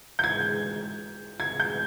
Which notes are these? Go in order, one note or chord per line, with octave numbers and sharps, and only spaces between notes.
G6
G#6
G#6
G6